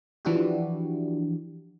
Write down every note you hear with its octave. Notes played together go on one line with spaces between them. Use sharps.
E3 F3 D4 E4 F#4 G4